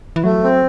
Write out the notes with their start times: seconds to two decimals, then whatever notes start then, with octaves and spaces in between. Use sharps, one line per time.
0.16 E3
0.24 F#3 A3
0.43 C4